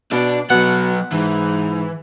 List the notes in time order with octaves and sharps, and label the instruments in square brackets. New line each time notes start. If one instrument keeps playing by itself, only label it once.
[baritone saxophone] B2 [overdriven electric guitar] D4 D5
[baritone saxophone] B2 [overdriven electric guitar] F#3 B3 [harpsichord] F#5
[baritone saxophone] G#2 [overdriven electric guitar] E3